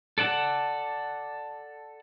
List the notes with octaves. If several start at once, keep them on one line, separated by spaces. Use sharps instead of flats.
A4 D5 F#5 A5